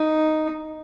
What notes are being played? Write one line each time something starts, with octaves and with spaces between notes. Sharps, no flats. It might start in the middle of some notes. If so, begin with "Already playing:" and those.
Already playing: D#4